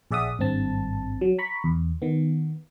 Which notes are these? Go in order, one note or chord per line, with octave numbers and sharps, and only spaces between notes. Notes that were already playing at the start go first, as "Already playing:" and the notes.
A#1 G#4 D5 E5 F#5 D#6
G#1 G2 C4 A5
F#3
A#5 B5 C#6
E2
D#3 B3